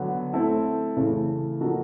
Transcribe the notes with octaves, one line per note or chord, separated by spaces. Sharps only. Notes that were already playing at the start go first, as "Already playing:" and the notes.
Already playing: D3 F#3 B3
A3 C4 E4 A4
C#3 E3 A3
F3 A#3 D#4 F#4 A4